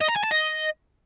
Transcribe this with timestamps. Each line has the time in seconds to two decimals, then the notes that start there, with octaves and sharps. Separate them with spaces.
0.01 D#5
0.08 A#5
0.16 G#5
0.23 A5
0.31 D#5